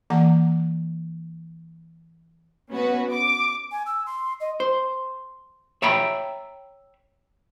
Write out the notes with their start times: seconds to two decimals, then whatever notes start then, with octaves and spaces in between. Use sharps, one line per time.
0.10 E3 A#3 F#5 A#5
2.72 B3 C#4 F#4 B4
3.11 D6
3.71 G#5
3.86 E6
4.06 C6
4.40 D#5
4.60 C5
5.82 C#5 E5 G5 A#5 B5